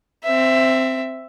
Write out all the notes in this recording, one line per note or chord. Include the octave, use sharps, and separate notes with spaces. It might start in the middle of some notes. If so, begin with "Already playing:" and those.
C4 E5